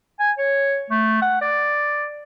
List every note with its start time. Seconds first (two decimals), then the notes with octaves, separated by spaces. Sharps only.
0.19 G#5
0.38 C#5
0.91 A3
1.22 F#5
1.41 D5